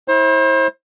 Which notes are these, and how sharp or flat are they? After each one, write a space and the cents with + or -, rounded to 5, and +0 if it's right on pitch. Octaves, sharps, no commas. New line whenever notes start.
E4 -25 C5 +35